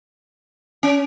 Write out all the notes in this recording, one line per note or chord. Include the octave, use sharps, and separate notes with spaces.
C#4